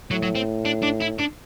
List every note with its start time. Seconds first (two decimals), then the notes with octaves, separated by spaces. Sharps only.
0.11 A2 F#3
0.22 F#3
0.35 C4
0.65 D4
0.83 D4
1.02 E4
1.20 D4